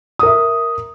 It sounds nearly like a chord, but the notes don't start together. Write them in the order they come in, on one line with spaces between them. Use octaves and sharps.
D#6 A#4 E5